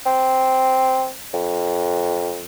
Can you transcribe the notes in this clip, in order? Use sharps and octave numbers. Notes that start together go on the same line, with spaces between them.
C4
F2